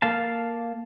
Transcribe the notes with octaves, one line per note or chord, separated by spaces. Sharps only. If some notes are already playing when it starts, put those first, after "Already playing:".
A#3 A4 F5 A5